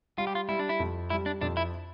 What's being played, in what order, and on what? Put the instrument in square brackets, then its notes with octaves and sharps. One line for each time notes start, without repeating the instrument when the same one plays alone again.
[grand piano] G3 [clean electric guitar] F4
[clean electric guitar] G4
F4
[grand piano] G3 [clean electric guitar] E4
[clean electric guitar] D4
E4
[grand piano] F2
[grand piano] G3 [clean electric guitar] E4
[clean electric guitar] D4
[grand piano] F2 [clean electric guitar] D4
[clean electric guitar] E4